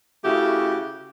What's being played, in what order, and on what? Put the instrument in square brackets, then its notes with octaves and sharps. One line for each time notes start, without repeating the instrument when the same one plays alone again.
[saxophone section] C#3 A3 E4 F#4 G4